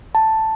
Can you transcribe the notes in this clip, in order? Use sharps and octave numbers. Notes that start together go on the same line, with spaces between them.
A5